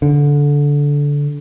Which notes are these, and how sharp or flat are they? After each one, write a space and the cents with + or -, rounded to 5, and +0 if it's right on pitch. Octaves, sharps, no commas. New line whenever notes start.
D3 -20